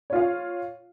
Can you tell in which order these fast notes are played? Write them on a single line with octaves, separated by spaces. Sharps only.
C#5 F4 F5